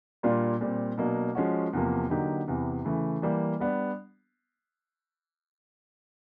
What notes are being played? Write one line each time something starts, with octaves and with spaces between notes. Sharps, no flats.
A#2 G3 A#3 D4 F4
A#2 G3 C4
B2 F#3 A#3 D4
F3 G#3 C#4 F#4
E2 C3 F3 A#3
D3 F#3 A#3 D#4 G4
E2 C3 E3
C#3 E3 A3
E3 G3 A#3
G3 B3 D4